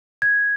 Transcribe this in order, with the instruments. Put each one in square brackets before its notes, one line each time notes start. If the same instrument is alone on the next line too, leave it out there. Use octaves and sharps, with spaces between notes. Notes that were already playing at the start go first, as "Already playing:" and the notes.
[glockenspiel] G#6